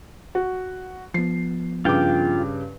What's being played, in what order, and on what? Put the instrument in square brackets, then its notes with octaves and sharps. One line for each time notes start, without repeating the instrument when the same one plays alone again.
[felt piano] F#4
[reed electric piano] F3 B3 [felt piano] C7
[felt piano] G2 C#3 D6 [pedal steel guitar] F4 G5